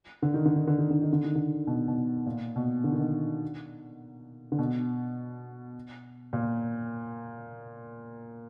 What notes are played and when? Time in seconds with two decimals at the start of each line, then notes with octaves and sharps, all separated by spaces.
0.22 D3
0.34 D#3
0.45 D3
0.56 D#3
0.67 D3
0.79 D#3
0.91 D3
1.02 D#3
1.13 D3
1.25 D#3
1.35 D3
1.67 B2
1.88 B2
2.26 A#2
2.56 B2
2.84 D3
2.92 D#3
3.01 D3
4.52 D3
4.58 B2
6.33 A#2